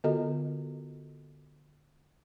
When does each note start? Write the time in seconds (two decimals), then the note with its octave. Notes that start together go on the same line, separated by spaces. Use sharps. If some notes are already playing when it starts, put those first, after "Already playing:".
0.04 D3 B3 F4 F#4 A4 D#5